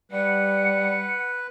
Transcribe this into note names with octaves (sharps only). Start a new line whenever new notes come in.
G3 B4 F#5